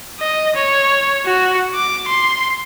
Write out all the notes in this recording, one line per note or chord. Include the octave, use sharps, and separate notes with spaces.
D#5
C#5
F#4
D6
C6